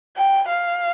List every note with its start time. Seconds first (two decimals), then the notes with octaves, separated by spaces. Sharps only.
0.17 G5
0.49 F5